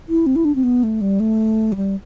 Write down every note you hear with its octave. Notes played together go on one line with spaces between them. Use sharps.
E4
C4
E4
D4
C4
B3
A3
G3
A3
F#3
G3